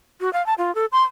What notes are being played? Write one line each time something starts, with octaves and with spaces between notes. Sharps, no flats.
F#4
F5
A5
F4
A4
C6